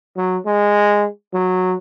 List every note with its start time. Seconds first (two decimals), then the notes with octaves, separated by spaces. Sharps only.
0.17 F#3
0.46 G#3
1.34 F#3